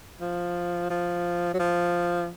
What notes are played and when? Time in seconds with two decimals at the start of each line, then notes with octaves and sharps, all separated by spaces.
0.20 F3
0.90 F3
1.54 F#3
1.59 F3